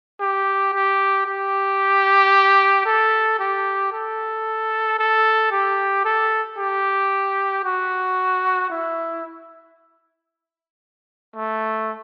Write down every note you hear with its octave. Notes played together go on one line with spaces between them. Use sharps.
G4
G4
G4
A4
G4
A4
A4
G4
A4
G4
F#4
E4
A3